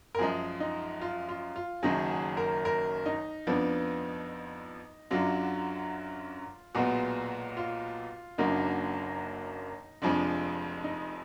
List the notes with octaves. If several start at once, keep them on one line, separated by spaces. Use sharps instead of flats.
A#4
F#2 F3 G#3 G#4
D#4
F4
F4
F4
F#1 F#2 D#3 F#3 G#4
G#4
A#4
A#4
D#4
F2 F3 B3 D4
F#2 D3 F#3 D4 F4
B1 A#2 G#3 B3 F#4
F4
F#1 F#2 D3 F#3 A#3 D#4
F1 F2 F3 G#3 D4
D#4